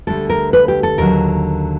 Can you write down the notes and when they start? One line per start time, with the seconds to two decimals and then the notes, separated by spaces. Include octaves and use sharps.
0.07 D2 D3 G3 A4
0.29 A#4
0.53 B4
0.68 G4
0.83 A4
0.98 D#2 D3 F#3 A#4